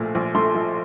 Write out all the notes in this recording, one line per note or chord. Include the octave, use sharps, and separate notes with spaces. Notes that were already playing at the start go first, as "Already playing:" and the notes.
Already playing: A#1 A#2 F3 A3
A#1
A3 C6
F3